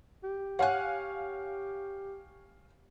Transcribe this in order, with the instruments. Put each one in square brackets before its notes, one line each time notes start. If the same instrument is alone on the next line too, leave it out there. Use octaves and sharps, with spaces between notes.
[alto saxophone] G4
[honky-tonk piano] C#5 F5 G#5 [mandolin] F#5 F#6